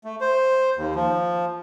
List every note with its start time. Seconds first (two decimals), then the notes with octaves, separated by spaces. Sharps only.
0.04 A3
0.21 C5
0.76 D#2
0.95 F3